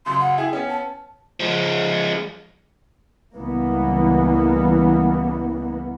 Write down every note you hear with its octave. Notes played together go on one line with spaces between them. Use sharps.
F#2 C#3 C6
F#5
E4 G#4 G5
B3 C#4
A5
F3 G#3
C#2 E3 G3 A#3 B3